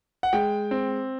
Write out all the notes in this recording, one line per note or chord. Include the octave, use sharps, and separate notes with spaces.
F#5
G#3 G5
C4